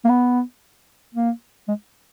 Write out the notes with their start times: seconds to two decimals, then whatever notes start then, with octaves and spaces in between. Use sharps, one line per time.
0.05 A#3
0.09 B3
1.14 A#3
1.68 G#3